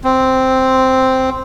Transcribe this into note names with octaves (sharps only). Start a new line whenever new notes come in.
C4